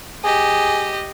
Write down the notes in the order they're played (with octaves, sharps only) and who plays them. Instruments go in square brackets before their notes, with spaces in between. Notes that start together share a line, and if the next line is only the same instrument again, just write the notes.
[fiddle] G4 D#5 [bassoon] G#4